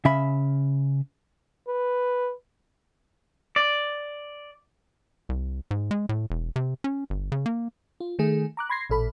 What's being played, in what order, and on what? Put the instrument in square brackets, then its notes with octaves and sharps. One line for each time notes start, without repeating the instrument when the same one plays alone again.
[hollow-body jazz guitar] C#3 C#4 E5 B5
[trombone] B4
[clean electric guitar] D5
[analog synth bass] C2
G#2
G#3
A2
E1
C3
C#4
G1
C#3
A#3
[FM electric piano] F4
D#3 A3 G#4
A#5 D6 F#6
B5 C6 G#6 A#6 C7
A1 A#2 A4 B5